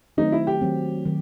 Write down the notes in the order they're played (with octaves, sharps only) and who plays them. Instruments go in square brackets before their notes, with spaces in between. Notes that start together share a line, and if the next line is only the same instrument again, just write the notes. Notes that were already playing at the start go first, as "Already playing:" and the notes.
[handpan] D#3 F#3 A3 C4 [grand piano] D#4
[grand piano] E4
G4
[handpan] D#3 F#3 A3 C4
D#3 F#3